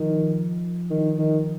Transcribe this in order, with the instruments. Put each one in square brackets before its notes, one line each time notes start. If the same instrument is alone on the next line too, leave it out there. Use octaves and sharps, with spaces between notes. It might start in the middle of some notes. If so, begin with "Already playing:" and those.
Already playing: [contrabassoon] D#3 [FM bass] F3
[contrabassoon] D#3
D#3